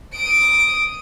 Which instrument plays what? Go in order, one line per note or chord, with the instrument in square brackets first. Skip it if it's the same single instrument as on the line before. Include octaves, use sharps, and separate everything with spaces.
[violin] D#6 D7